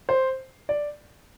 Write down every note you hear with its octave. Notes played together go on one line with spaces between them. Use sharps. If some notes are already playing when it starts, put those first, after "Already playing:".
C5
D5